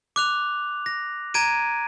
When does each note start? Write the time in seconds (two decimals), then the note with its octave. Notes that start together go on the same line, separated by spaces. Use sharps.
0.16 D6 F#6 F7
0.86 A#6
1.34 A#5 G#6 D7 D#7